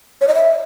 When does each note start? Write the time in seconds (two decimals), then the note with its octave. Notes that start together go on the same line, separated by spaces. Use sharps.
0.21 C#5
0.28 D#5
0.35 E5